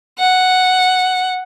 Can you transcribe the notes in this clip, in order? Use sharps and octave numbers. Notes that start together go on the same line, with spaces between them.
F#5